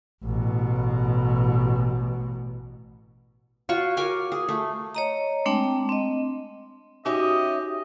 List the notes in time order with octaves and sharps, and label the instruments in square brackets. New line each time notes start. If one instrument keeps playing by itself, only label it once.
[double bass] A1 B2
[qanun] F4 F#4 C#5 C#6
A#4 C#5 G#5 D6
G#4
A3
[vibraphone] C#5 D#5 A#5
G#3 A3 C4 D4 G5
C4 D#5
[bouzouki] C#4 E5 [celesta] D#4 F#4 D#6 [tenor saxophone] G4 [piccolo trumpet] D#5